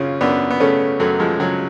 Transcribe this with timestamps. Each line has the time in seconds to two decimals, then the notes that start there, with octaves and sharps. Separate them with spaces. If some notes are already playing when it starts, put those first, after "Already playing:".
Already playing: F#2 C#3 C#4 F4
0.21 F#2 B3 D4
0.51 B3
0.60 C#3 A3 C#4
1.00 F#2 F#3 A3
1.20 F3 G#3
1.40 C#3 F#3